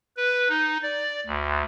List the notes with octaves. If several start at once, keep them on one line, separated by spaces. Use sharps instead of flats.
B4
D#4
D5
D2